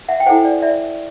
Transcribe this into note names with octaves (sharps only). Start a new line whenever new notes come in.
E5 F#5
G5
E4 A4 C5 F#5 G#5
D5
D5 E5